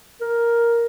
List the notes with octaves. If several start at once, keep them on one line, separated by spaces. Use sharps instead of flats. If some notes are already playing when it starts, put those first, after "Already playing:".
A#4